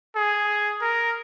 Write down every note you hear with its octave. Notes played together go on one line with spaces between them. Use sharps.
G#4
A#4